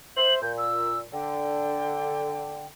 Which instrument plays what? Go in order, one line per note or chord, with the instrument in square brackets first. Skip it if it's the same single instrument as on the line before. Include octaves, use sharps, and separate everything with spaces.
[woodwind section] C5 E5 [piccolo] F#7
[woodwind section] A#2 [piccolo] G6
[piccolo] E6
[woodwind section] D3 [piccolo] G5